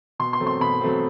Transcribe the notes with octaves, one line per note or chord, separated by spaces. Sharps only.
B2 C6
C6
F#3 A3 C4
C6
B2 B5
F#3 A3 C4